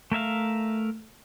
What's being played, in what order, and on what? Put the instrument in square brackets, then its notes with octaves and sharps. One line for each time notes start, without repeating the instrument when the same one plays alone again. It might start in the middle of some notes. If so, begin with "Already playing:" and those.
[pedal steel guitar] A3 A#4 E5 F5